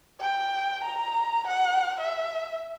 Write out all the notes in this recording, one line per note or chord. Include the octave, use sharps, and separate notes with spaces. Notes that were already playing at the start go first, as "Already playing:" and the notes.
G5
A#5
F#5
E5